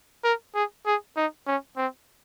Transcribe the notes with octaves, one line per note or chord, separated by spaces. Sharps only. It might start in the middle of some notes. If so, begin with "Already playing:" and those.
A#4
G#4
G#4
D#4
C#4
C4